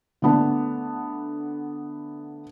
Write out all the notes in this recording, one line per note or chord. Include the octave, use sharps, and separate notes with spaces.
D3 A3 B3 D4